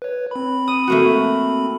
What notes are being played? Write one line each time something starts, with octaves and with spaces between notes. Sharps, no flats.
B4 C#5
C4 B5
D#6
A3 A#3 F#4